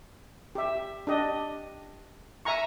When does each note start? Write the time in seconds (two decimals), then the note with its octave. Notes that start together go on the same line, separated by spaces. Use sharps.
0.55 G4 E5
1.07 D4 G4 D#5
2.45 E5 G#5 A#5 C#6